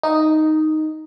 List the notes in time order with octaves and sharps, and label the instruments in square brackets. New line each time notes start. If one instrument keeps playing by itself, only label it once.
[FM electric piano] D#4 D#5